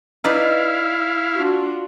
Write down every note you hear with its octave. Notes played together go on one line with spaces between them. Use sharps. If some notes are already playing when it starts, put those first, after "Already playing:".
D#4 E4 B4 D5 F5
D4 F4 F#4